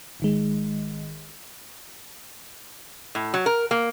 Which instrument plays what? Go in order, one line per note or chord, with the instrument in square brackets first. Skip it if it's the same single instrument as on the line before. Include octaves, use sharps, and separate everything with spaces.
[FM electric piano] G#1 D#3 G#3
[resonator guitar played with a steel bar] A2
F#3
A#4
A#3